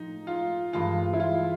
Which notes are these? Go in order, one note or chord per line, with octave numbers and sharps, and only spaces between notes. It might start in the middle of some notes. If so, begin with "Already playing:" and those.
Already playing: A2 F3 D#4
F4
G2 E3 G#3 F4
E4
F4